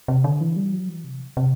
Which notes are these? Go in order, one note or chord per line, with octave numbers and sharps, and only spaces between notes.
C3
D3
E3
G3
F#3
E3
C3
C3